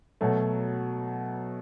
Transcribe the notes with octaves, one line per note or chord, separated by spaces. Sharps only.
B2 F#3 A3